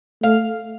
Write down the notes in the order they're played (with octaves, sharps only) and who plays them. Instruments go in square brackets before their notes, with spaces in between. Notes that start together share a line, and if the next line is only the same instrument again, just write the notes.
[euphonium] A3 [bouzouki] F5